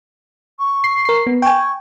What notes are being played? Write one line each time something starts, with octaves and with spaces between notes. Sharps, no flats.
C#6
C7
A#4 C7
B3
G5 G#5 C#6